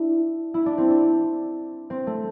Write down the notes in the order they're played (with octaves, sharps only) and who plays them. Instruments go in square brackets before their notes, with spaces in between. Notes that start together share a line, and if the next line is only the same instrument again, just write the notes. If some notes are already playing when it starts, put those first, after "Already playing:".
Already playing: [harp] D4 E4
E4
D4
C4
D4
C4
A3